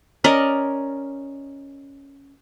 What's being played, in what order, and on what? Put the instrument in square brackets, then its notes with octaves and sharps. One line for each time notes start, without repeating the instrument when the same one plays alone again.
[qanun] C#4 A#4 D5 D#5